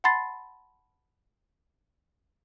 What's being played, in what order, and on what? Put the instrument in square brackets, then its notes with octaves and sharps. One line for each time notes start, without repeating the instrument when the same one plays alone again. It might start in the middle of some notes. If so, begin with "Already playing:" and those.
[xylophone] F#5 A5 B5 C6 A6 C7